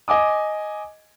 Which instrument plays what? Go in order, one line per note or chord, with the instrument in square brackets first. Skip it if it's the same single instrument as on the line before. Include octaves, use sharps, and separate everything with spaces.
[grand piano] D#5 G#5 D6 D#6